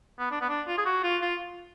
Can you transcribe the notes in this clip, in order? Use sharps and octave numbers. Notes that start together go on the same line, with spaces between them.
B3
D4
B3
D4
F4
G#4
F#4
F4
F4